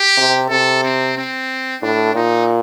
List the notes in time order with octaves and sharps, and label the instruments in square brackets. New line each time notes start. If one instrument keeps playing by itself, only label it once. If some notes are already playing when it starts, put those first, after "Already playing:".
Already playing: [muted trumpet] G4
[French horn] C3
[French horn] C3 [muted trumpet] A4
[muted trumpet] C4
C4
[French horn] A2 [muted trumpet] D4
[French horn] A#2 [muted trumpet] D#4